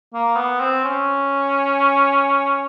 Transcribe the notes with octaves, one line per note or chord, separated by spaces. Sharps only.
A#3
B3
C4
C#4